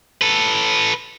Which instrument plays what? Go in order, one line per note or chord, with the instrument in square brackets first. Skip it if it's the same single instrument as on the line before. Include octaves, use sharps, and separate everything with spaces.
[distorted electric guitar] A4 B4